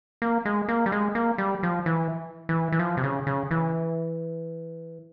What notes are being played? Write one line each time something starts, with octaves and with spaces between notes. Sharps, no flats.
A#3
G#3
A#3
G3
G#3
A#3
G3
F3
E3
E3
E3
F3
C3
C#3
C#3
E3